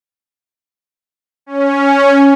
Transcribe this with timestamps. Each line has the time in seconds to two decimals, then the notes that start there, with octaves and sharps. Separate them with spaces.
1.46 C#4